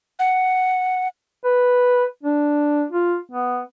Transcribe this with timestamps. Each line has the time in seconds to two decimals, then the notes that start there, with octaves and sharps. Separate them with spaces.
0.19 F#5
1.44 B4
2.23 D4
2.92 F4
3.32 B3